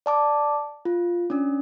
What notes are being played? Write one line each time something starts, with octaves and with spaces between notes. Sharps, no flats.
D5 A5 D6
F4
C#4 D4